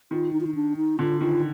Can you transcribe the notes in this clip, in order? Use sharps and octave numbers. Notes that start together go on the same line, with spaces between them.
D#3 F4
D#4
F4
D#4
D4
D#4
D3 F4
D#3 F4